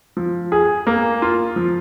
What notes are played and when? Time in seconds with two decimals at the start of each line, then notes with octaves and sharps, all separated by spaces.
0.17 F3
0.52 G#4
0.87 A#3
1.22 F4
1.56 F3